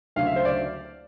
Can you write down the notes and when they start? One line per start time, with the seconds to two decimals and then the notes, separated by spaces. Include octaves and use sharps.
0.16 D2 C#3 F#3 F5
0.27 E5
0.36 C5
0.45 D5